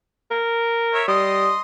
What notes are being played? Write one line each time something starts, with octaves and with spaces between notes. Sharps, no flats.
A#4
C#5 E5
G3 D#5 C6 D#6